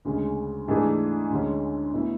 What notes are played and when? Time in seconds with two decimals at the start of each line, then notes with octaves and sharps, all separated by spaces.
0.05 D2 C#3 G#3
0.68 G#2 E3 A3 D4 G#4
1.30 D2 D3 G#3 C#4
1.93 B2 A3 E4